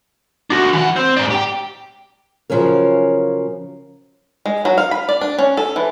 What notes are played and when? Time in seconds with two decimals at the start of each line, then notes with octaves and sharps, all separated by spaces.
0.50 D4 F#4
0.73 E3 F#5
0.96 C4
1.17 G#2 D4
1.31 G4 G5
2.50 C#3 F3 F#3 C#4 A#4
4.46 G#3
4.65 F#3
4.78 F5
4.91 B5
5.09 D5
5.21 D4
5.38 C#4
5.57 A4
5.76 E3